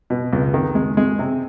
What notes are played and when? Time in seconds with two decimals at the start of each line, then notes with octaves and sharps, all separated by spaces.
0.10 B2
0.33 C#2
0.54 D#3
0.75 G#3
0.97 G#3
1.19 C3